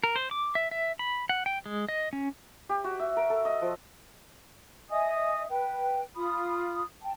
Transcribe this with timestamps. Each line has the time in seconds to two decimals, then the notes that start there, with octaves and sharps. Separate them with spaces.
0.04 A#4
0.16 C5
0.31 D6
0.55 E5
0.71 E5
0.99 B5
1.29 F#5
1.46 G5
1.66 G#3
1.89 D#5
2.13 C#4
2.69 G4
2.84 F#4
2.99 E5
3.17 A#4
3.30 A4
3.45 D#5
3.62 F3
4.90 D#5 E5 G#5 D#6
5.49 B4 G5
6.16 F4 B5 D#6
7.01 G5 A5